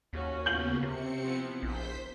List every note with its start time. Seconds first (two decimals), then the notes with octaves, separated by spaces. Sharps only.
0.13 D#2 C#4 F#4
0.46 C#3 A#3 B3 G6 F#7
0.83 C3 C4 C#7
1.23 F3 B3 E4
1.63 A#1 C5 G6 B6